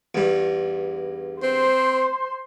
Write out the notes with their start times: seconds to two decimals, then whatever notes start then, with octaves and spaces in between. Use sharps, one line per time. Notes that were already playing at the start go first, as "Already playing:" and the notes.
0.15 E2 G2
1.43 C4 C5 C6